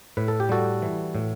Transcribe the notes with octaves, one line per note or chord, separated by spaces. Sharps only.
A2 B4
A4
G4
G3 F#4 A4
E3
A2